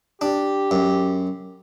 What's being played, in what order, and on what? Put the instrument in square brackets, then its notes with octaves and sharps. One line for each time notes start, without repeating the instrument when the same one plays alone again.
[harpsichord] D4 [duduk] G4
[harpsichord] F#2